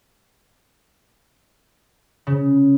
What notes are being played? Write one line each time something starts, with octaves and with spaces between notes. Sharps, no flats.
C#3